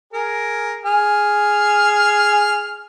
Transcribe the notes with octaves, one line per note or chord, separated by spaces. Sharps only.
G#4 A#4
G#4 F6